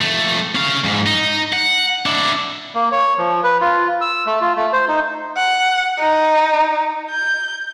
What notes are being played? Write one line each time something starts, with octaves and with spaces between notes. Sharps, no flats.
F2 A3
C#4 F5
F2 G#2
D#4
F#5
D4 E4
A#3
C#5
F3
B4
F4
E6
A3
F4
A3
C5
D#4
F#5
D#4
G6